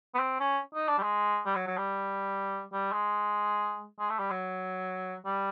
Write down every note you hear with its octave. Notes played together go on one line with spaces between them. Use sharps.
B3
C4
C#4
D#4
D4
G3
G#3
G3
F#3
F#3
G3
G3
G#3
G#3
A3
G3
F#3
G3